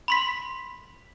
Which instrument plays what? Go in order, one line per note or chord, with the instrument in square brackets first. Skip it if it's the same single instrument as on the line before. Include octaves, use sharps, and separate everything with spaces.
[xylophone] B5 C6 B6